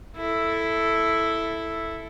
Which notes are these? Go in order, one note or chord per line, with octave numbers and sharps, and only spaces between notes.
E4 A4